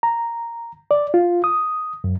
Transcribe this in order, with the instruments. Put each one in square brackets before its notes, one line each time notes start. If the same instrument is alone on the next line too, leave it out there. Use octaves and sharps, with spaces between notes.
[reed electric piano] A#5
D5
F4
D#6
F#2